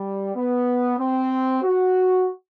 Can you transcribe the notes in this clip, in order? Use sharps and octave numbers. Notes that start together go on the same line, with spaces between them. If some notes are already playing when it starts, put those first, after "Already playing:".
Already playing: G3
B3
C4
F#4